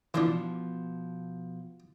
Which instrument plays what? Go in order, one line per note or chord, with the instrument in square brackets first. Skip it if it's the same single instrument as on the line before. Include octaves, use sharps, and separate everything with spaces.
[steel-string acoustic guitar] B2 F3 [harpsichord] E3 D4